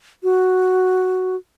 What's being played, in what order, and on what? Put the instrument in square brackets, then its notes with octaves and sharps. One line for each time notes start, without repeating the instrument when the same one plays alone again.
[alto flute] F#4